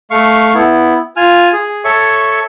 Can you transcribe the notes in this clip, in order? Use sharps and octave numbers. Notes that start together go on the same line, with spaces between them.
A3 F5 C#6
B3 E4
F4 G#5 F6
G#4
A4 C#5 E5 C#6